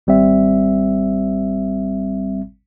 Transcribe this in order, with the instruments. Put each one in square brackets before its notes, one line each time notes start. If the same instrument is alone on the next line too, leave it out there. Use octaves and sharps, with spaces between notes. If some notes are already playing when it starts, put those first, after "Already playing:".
[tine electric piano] G#1 G3 C4 E5